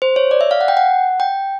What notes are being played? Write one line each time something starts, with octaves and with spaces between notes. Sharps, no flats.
C5
C#5
D5
E5
F5
F#5
G5
F#5
G5